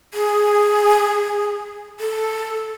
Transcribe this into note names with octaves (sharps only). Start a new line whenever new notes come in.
G#4
A4